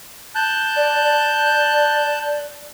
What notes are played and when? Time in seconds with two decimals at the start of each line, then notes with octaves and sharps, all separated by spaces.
0.35 A5 F#6 G6
0.76 D5
1.05 D5